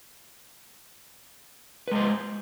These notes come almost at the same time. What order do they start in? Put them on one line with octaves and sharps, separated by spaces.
B4 G#3 C5